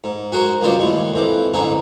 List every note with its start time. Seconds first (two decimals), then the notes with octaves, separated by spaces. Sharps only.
0.04 G#2
0.32 F#4 G#4 A#4 C5
0.62 C#2 G2 C#3 F4 C5 D5
0.79 D#2 A2 G#3
1.14 F2 E3 D6
1.54 A1 G#2 D3 D#4 G#4